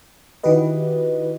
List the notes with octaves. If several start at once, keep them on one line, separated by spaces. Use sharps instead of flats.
D#3 E4 F#4 G4 B4 D#5